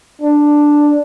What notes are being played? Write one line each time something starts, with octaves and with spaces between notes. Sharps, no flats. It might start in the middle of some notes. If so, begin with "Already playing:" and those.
D4